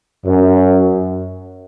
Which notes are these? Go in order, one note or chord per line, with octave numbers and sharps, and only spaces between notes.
F#2